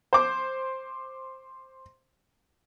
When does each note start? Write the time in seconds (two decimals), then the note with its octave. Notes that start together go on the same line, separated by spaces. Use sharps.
0.13 C5 D6